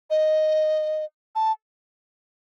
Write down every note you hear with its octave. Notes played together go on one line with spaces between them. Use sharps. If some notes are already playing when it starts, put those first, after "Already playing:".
D#5
A5